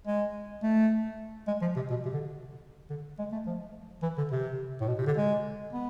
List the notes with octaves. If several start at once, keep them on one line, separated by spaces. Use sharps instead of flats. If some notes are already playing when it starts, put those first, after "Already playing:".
G#3
A3
G#3
F3
C3
B2
C3
D3
D3
G#3
A3
F3
E3
D3
C3
A2
B2
C3
D3
G#3
B3